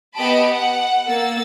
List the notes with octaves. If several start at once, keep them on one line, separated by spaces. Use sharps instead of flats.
B3 G4 D#5 A5 B5 D7
F#5
A#3 E6 A6